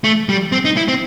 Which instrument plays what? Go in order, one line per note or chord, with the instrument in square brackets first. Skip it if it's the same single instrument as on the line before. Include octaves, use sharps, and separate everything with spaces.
[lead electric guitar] A3
G3
C4
D#4
E4
C4